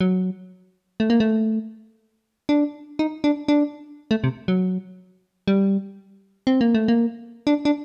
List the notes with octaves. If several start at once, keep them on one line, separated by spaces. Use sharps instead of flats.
F#3
A3
A#3
A3
D4
D#4
D4
D4
A3
C3
F#3
G3
C4
A#3
A3
A#3
D4
D4